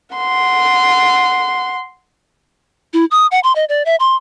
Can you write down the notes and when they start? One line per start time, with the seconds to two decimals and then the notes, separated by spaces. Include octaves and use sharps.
0.16 F#5 C6
2.94 E4
3.11 D#6
3.31 F#5
3.44 C6
3.56 D#5
3.69 D5
3.86 E5
4.00 C6